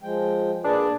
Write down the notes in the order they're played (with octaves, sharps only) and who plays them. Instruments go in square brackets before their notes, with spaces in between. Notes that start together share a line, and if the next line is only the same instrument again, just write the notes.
[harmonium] F3 G#3 G5
[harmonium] A#2 G#4 B4 [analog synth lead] D4